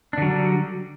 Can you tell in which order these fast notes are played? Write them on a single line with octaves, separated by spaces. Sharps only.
D4 D3 F#3 G3